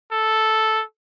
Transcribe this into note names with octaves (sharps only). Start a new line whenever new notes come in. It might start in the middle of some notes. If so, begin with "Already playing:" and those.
A4